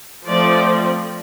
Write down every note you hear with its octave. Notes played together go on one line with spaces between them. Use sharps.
F3 A3 C4 D5